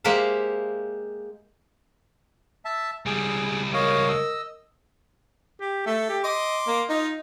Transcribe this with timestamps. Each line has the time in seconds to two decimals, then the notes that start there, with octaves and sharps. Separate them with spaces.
0.04 G#3 A#3 G4 C5 E5 F5
2.65 E5 A5
3.06 C#2 G3 G#4
3.74 A#4 C#5 D#5 F5
4.09 D#5 E6
5.61 G4
5.86 A3 A4
6.09 G4
6.24 D#5 C6 D6
6.67 A#3
6.89 D#4 F4 D#5